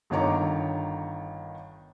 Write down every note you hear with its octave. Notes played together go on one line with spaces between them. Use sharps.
G1 D3 D#3 C#5 A#5 D6